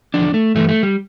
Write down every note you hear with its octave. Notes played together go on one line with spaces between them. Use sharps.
E2 D3 F3 D4
A3
G2 E3 A3
A3
G3